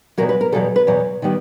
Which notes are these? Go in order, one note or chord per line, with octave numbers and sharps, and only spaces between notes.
E2 B2 F#3 A#4
B4
A#4
E2 B2 F#3 A4
B4
E2 B2 F#3
D#3 G3 B3